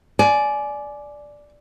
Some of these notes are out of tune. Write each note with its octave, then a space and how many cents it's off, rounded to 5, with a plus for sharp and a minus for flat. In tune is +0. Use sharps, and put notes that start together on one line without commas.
D5 +0 G#5 +25